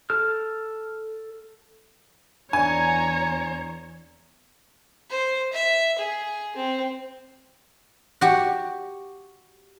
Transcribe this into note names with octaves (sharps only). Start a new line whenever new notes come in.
A4 F6
E2 D4 C#5 D5 G#5 A#5
C5
E5
G#4
C4
F#4 G4